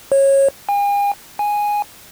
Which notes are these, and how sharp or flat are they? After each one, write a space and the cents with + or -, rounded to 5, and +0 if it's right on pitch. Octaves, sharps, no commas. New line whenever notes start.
C#5 -20
G#5 -45
G#5 -5